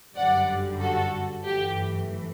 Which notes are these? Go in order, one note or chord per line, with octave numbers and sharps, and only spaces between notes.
G1 F#2 D3 G3 D5 F#5
F#4 A4
G1 F#2 E3 A3 G4